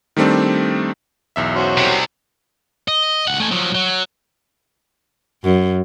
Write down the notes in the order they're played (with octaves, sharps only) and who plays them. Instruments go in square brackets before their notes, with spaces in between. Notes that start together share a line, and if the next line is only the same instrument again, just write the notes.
[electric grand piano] D#3 G3 A3 C4 D4
B1 E2 E5
[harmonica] C#4 F#4 C5
[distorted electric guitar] C2 C3
D#5
C#2 F#5
A3 G#5
F3 F#3
F#3
[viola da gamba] F#2